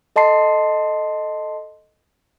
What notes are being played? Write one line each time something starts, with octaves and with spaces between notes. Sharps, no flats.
A4 D#5 A5 C6 C7